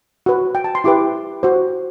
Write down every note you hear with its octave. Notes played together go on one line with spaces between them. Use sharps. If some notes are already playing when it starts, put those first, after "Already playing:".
F#4 B4
G5
A5
C6
E4 G4 B4 D6
F#4 C5